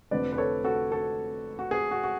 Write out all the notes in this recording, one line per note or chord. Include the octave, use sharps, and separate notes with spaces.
F1 F2 D3 B4 D5
B4
A4 C#5
F#4 A4
F#4 A4
F#4
G#4
F#4
F#4